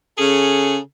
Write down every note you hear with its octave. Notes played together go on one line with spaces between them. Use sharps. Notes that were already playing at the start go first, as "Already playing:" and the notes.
C#3 G#4 A4